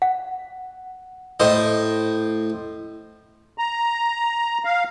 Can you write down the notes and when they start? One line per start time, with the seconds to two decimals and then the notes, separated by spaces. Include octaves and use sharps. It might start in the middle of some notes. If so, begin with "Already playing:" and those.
0.02 F#5
1.40 A2 C5 D#5
3.58 A#5
4.65 F5